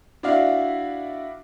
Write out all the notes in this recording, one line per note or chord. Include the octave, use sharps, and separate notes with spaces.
D4 E4 F#4 D5 E5 F5